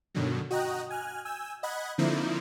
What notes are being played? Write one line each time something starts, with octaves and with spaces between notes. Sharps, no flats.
G2 B2 D3 D#3 F#3
F#4 D#5 G5 A#5 F#6
G#5 F6 F#6
G#5 E6 G6
D#5 F#5 B5 F#6 G#6
D3 F3 A#3 C4 D#4 E4